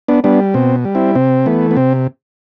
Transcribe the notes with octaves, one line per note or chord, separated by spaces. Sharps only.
B3 D4
G3 B3 D4
B2 C4
G3
C4 E4
C3 C4
E3 A3 B3
B3
C3 C4